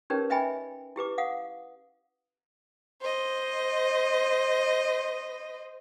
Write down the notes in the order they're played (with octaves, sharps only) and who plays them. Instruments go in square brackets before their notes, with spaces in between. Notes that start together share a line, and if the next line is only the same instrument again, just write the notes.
[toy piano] C#4 D#4 G4 A#4 B4 C#5
B4 D#5 E5 G5 G#5 B5
E4 G4 B4 D6
F5 F#5 D#6
[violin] C5 D#5